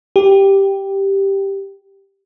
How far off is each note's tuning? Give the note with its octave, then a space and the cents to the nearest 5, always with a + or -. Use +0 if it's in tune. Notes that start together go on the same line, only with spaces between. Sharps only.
G4 +0